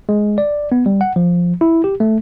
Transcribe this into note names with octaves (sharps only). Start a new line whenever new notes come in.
G#3
D5
B3
G3
F#5
F3
E4
G4
A3